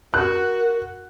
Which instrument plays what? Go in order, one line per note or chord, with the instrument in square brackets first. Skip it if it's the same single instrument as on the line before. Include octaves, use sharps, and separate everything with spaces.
[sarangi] F#4 [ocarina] A#4 [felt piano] F#6